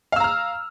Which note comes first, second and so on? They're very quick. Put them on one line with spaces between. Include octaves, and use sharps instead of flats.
F5 E6 A#5 F6